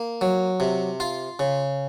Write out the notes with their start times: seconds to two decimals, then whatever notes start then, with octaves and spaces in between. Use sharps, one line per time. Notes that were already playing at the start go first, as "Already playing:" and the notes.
Already playing: A#3
0.21 F#3
0.60 C3
1.00 F4
1.39 C#3